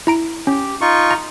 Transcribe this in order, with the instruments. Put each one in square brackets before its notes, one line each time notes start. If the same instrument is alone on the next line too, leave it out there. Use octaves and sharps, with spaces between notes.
[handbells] E4 A#5 D7
[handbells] C#4 [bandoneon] G4
[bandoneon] D#4 F4 C#6
[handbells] A#5